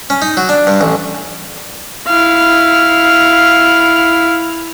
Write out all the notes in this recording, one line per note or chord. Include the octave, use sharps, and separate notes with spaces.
C#4
D#4
F#3
D4
G2
A1
E4 F5